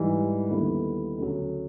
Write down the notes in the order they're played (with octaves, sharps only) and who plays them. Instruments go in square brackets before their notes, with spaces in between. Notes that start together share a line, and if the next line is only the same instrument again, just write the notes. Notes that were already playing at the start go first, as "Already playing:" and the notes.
Already playing: [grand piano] G#2 E3 G3
D#2 D3 G3 B3 E4
D2 C#3 F#3